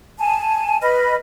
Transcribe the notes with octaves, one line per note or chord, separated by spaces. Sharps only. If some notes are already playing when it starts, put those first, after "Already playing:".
G#5 A5
B4 D#5 B5 F6